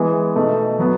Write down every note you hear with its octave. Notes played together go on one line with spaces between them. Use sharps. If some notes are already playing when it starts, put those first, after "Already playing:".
Already playing: E3 G#3 B3
B2 A3 D#4
F#3 B3